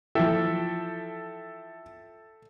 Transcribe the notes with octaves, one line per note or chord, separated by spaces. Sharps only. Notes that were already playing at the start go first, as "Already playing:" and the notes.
E3 F3 A4 E5 G5